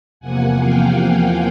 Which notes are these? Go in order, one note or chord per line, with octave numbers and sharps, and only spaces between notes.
E2 C3 F3 A#3 F#5 G#5
F5 G5
F5 G5